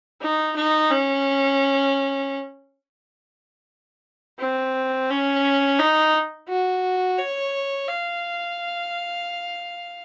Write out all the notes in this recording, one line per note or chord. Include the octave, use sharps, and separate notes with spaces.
D#4
D#4
C#4
C4
C#4
D#4
F#4
C#5
F5